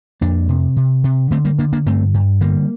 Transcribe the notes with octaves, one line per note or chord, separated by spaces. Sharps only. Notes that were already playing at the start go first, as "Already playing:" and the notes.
F2 A#3 D4
C3
C3
C3
D3 A3 C4
G3 A#3
D3 A#3 D4
A#3 D4
G2 A3 C4
G2
D3 G3 A#3